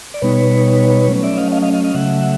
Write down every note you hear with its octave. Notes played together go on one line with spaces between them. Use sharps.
D5
B2 G3 B3 D#4 B4 C#5
F#3 A3 C#4
D5 E5
D#5 F5
D#5 F5
D#5 F5
D#5 F5
D#5 F5
C#3 F#3 A3 E5 F#5